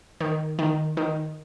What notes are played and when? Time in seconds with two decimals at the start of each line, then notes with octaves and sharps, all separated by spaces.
0.21 D#3
0.59 D#3
0.97 D#3